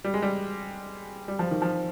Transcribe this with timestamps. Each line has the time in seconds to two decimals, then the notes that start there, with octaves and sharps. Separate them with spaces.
0.04 G3
0.14 G#3
0.22 G3
1.28 G3
1.39 F3
1.51 D#3
1.62 F3